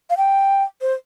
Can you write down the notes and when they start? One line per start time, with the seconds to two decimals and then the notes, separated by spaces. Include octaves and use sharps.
0.10 F5
0.17 G5
0.81 C5